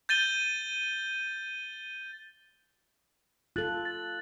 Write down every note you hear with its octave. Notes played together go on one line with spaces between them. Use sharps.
G6 A6 D#7 G7
F4 A4 F#6 A6 F#7
A6